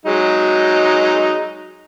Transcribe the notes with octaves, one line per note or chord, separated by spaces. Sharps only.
F#3 G#3 D#4